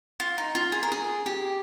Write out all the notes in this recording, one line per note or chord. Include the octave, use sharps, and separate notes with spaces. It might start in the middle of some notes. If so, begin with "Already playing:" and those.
F4
D#4
F4
G#4
A#4
G#4
G4